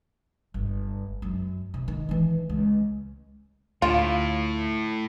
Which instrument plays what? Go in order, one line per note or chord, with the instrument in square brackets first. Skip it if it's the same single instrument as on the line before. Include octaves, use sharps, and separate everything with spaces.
[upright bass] G1
F#2
C3
D#3
E3 D#4
C#2
[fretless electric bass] D2 [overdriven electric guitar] A2 [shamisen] F4